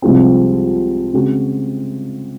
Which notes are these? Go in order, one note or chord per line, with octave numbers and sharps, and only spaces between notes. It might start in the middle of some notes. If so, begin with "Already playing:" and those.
C2 C3 F3 G#3 C4
C#3 G#3 C4 F#4